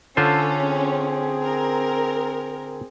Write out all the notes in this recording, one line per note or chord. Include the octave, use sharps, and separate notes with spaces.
D3 C#4 F4 A4 C5
C4 G#4
A#4